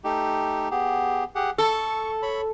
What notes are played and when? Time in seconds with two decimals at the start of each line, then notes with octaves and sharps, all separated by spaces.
0.04 A3 D#4 G4
0.71 B3 G4 G#4
1.35 G4 G#4 F#5
1.58 A4 C#6
2.22 C#5 B5